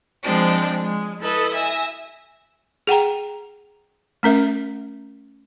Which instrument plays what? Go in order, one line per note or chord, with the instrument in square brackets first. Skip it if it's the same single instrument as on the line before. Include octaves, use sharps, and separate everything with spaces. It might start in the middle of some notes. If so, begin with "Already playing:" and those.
[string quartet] F3 G#3 C4 D4
G#3
E4 A4 B4 D#5
E5 G#5 A#6
[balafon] G#4 F#5 G5 A#5
A3 C#4 A#4 E5